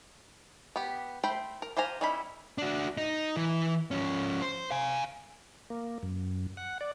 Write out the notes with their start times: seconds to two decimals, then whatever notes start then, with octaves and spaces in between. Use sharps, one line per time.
0.76 B3 G4
1.23 A3 C5 G5 B5
1.62 A#4
1.77 G4 C5 F5 G#5 A#5
2.01 G3 C#4 D#4 E4 B5
2.58 D4 F#4
2.97 D#4
3.37 E3
3.91 F3 C#4
4.42 C5
4.71 F5 G#5
5.70 A#3
6.03 F#2
6.57 F#5
6.81 D5